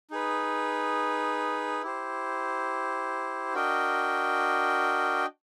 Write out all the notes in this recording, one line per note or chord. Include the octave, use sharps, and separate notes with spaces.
D#4 G#4 B4
E4 G4 C5
D4 F#4 A#4 D#5 G5